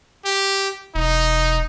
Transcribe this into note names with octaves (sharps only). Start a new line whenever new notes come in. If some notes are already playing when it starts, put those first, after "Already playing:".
G4
E1 D#4